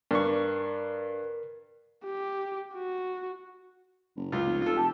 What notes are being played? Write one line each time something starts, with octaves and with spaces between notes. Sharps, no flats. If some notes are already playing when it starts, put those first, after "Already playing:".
G2 D4 A#4 C#6
G4
F#4
F#1
C#2 F4
F1
F4 A4
F1 G4 A5